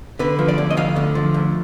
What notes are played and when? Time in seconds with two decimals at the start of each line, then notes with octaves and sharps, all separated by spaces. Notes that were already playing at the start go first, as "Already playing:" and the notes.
0.19 D3 B4
0.39 F3
0.48 D5
0.58 D2
0.70 D#5
0.77 D2 F5
0.96 D3
1.15 F3
1.34 D2